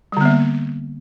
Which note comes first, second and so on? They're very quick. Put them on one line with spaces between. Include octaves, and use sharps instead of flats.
G3 D3 B3 A#3